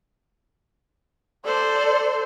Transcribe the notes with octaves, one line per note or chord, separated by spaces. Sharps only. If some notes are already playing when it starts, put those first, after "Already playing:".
A4 C5 D5